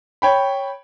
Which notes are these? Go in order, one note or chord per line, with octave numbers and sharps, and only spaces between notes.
C#5 G5 B5